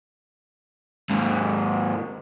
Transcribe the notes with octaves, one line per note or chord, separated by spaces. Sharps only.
D#2 G#2